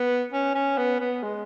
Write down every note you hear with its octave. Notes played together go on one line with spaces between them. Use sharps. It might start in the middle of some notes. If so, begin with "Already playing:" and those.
Already playing: B3
C#4
C#4
B3
B3
G#3